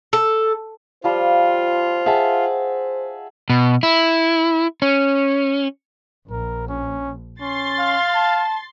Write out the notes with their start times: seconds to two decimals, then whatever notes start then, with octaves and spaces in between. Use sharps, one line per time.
0.13 A4
1.04 F3 G3 F4 C5
2.06 G#4 E5 F#5 A5
3.50 B2
3.83 E4
4.82 C#4
6.31 A#1 A#4
6.68 C#4
7.41 C#4 C6 A6
7.79 F5
8.15 A5